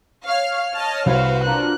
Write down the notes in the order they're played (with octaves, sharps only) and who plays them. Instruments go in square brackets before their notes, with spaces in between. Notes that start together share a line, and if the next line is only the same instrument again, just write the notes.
[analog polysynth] C#5 F6 [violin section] F5
[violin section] D#5 A5
[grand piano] C2 [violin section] F#4 B4 C5 [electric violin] F5
[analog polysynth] D4 F4 A#4 [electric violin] F#6